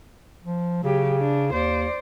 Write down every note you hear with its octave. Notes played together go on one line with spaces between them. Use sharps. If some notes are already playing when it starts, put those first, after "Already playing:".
F3
C#3 F#3 G4
D4
D#2 C5 D5